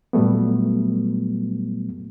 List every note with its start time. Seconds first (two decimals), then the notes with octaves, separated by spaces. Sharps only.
0.13 A#2 F#3 G3 A3 B3